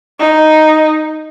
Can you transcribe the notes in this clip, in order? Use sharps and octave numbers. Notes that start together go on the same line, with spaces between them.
D#4